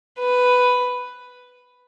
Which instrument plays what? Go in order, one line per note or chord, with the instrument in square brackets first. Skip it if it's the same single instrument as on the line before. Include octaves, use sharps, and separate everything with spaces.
[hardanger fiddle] B4